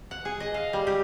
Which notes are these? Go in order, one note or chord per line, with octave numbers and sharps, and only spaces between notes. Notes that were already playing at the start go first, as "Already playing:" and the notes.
F#5
G#4
D#5
F5
G3
G4